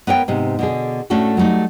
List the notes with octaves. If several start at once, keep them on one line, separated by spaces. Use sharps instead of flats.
B3 A#4 C#5 G5
G#2 C3 B3
B2 D3 G#4
A2 A3 C#4 D4 F#4 A4
F#3 G3 A3 D#4